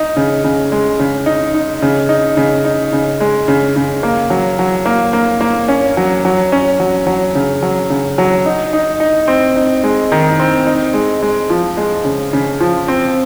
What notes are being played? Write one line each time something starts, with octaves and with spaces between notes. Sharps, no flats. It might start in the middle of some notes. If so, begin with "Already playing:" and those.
Already playing: D#4
C#3
C#3
G#3
C#3
D#4
D#4
C#3
D#4
C#3
D#4
C#3
G#3
C#3
C#3
A#3
F#3
F#3
A#3
A#3
A#3
C#4
F#3
F#3
C#4
F#3
F#3
C#3
F#3
C#3
F#3
D#4
D#4
D#4
C4
D#4
G#3
D#3
C4
D#4
G#3
G#3
F3
G#3
C#3
C#3
F3
C4